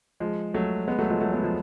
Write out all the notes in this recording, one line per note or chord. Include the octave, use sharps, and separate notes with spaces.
F3 G#3
F#3 A3
G#3 B3
F#3 A3
F3 G#3
F#3 A3
G#3 B3
F3 G#3